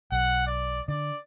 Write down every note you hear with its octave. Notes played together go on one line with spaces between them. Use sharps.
B1 F#5
D5
D3 D5